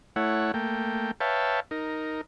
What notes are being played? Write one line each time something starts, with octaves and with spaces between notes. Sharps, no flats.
A3 E4 C#5 F#5
A3 A#3 G5
B4 C#5 E5 F5 G5 A5
D#4 A#4